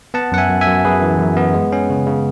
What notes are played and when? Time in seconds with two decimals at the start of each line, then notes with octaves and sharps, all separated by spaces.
0.14 B3 F#5 A5
0.32 F#2 F#5
0.38 E5 G#5
0.49 F#2
0.61 E5 G#5
0.67 F#2
0.85 F#2 G#4 B4
1.02 E3
1.19 F#2
1.37 B3
1.54 G#3
1.72 C#4
1.90 C#3
2.07 C#3